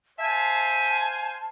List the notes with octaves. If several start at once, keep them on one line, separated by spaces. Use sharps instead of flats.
C5 E5 F5 G#5 A5